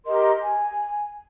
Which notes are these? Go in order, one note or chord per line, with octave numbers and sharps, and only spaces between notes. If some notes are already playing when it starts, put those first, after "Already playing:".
G4 A#4 D#5 C6
G#5